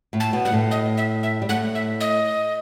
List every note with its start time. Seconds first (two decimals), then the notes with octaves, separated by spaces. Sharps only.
0.13 A2 A3
0.20 A5
0.33 B2 B3
0.45 G3 F#5
0.52 A2 A3
0.71 D#5
0.97 E5
1.23 E5
1.42 G3
1.49 A2 A3 F#5
1.75 E5
2.00 D#5